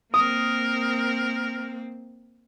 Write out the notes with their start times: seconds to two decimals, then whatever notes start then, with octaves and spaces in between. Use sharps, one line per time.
0.14 A#3 C4 A#4 D#6